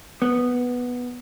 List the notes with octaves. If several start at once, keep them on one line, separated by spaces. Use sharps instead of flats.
B3